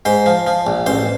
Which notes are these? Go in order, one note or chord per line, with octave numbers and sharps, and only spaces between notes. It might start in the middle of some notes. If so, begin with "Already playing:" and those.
G#2 C5
F3
F3
A#1
A1 C5